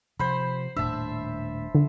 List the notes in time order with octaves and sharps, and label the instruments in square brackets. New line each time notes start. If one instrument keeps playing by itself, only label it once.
[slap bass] C3 F3 [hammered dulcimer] C5 B5
[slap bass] D#1 A2 D4 [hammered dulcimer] E5 A5
[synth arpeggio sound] D3